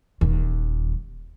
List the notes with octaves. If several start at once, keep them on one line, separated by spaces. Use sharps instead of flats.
D#1 D#2